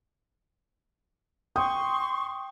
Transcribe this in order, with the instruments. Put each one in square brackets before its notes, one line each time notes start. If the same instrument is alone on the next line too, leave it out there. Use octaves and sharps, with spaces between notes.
[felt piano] G5 D#6 [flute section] C6 C#6